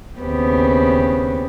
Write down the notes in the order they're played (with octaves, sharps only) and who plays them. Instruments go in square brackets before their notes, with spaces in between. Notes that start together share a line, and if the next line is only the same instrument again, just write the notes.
[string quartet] D#2 C#3 B3 C4 G4